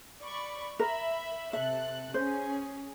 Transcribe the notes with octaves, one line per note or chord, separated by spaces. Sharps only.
D5 B5 C#6
A#4 E5 B5
C3 A4 E5 F#6
C#4 G#4 C5